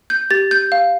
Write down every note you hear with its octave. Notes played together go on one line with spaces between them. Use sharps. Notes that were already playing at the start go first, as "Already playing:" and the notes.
G6
G4 A6
G6
F5